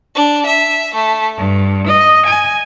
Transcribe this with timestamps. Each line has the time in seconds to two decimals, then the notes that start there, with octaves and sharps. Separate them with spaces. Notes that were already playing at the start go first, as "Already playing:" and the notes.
0.17 D4
0.47 E5
0.95 A3
1.38 G2
1.86 D#5
2.26 G#5